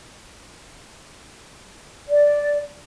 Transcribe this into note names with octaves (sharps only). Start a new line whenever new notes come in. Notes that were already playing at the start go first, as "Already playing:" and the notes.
D5